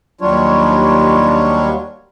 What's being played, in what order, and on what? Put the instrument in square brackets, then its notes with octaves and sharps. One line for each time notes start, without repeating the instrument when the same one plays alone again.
[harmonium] D#2 F#3 G3 D4 F4 C#5